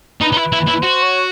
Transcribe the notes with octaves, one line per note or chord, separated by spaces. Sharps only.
D#4 B4
D#4
E4
E4
E4
F#4 C5
C#5